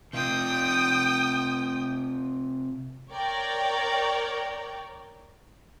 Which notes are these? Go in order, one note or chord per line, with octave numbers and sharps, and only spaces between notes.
C3 F4 G5 D#6
A#4 C#5 D5 G5